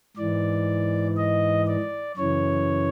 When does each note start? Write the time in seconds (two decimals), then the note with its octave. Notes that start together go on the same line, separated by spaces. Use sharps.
0.17 G#2 E3 D5
1.17 D#5
1.67 D5
2.17 F#2 C#3 E3 C#5